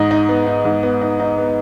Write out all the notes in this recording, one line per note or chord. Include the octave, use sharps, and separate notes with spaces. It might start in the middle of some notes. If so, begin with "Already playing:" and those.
Already playing: G#2 D#4 D#5
D#4
B3
D#4
G#2
B3
D#4
D#4
B3